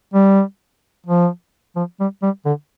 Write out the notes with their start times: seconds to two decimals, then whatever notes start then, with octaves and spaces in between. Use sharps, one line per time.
0.14 G3
1.06 F3
1.76 F3
2.00 G3
2.22 G3
2.45 D3